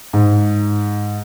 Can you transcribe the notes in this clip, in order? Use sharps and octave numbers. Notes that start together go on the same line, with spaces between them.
G#2